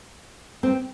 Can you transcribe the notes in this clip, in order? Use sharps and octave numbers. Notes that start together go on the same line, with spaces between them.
C4